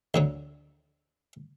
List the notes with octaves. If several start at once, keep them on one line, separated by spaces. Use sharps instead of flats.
D2 D3 F#3